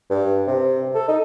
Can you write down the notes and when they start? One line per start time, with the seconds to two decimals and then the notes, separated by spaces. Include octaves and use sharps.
0.10 G2
0.47 C3
0.95 A4
1.08 D#4